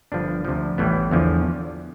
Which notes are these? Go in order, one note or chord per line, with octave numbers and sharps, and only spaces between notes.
G1 G2 F3 D4
D2 C3 F3
A1 A2 E3 G3 B3
E2 D3 F3